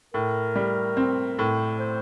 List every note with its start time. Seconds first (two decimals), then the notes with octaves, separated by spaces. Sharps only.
0.14 A2 A#4
0.56 G3
0.97 C4
1.39 A2
1.79 C5